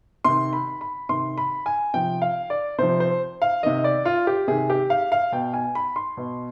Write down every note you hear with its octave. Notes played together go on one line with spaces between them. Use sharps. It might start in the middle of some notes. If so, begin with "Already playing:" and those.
C3 D#3 C6
B5
B5
C3 D#3 C6
B5
G#5
C3 F3 G5
F5
D5
C3 F3 C5
C5
F5
C3 D#3 D#5
D5
F4
G4
C3 D#3 G#4
G4
F5
F5
B2 G5
G#5
B5
C6
B2